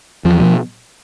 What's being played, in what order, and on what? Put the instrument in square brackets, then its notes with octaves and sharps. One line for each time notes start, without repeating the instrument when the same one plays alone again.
[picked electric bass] E2 F3
B2 F3